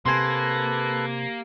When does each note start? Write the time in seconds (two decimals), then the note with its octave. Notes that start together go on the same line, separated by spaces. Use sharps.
0.06 C3 A#3 A4 B4 G#5 C6 F#6